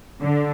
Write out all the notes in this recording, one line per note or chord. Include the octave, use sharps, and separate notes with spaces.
D3